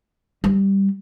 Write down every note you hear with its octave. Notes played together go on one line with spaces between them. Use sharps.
G3